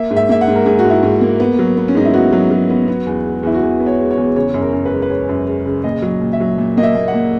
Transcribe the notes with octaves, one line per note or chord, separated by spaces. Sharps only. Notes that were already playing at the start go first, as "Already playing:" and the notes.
Already playing: A#3 E5
G#2
E5
A#3 E5
F#5
G#2
A#4
G#2 G#4
F#4
G#2
E4
G#2
A#3
B3
F#3
B3
C#4
G#2 D#4
E4
B3 F#4
F#3
F#3
B3
B3
E2
G#3
E2 E4
F#4
E2 G#4
B3
C#5
G#3
C#5
E2
C#3 C#5
F#2
A#4
F#2
B4
G#3
B4
G#3 C#5
F#2
G#3
C#3
A#2 D#5
F#3
A#2
E5
F#3
A#2
A#3 D#5
E5
A#2
F#5
A#2